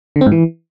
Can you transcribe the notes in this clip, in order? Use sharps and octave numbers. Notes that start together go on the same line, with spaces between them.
D3
C4
G#2
E3